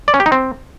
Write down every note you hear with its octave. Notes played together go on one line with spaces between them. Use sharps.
D5
C#4
G4
D#4
C4